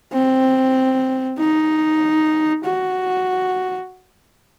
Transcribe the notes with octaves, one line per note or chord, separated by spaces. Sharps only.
C4
D#4
F#4